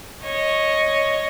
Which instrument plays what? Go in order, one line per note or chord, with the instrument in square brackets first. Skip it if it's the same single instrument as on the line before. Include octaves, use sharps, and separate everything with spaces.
[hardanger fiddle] C#5 D#5